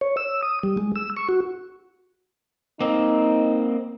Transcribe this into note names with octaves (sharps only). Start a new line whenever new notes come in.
C#5
E6
D#6
G3
G#3
E6
C#6
F#4
A#3 C4 D#4